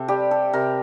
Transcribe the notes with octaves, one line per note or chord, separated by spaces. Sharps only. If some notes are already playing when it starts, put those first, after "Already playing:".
Already playing: C3 A4
G3 G4
A4
C3 A#4